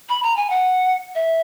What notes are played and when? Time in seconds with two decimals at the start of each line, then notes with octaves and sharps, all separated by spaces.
0.09 B5
0.23 A#5
0.37 G#5
0.50 F#5
1.15 E5